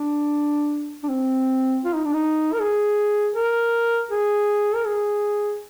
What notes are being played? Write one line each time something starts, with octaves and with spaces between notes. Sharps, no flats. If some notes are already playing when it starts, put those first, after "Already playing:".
Already playing: D4
D4
C4
F4
D#4
D4
D#4
A#4
G#4
A#4
G#4
A#4
G#4